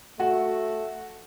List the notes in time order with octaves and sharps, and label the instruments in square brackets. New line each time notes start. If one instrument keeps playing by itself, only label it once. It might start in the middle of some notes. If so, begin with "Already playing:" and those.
[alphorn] A3 [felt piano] F#4